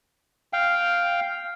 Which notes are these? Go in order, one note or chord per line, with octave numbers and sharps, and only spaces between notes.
F5 G5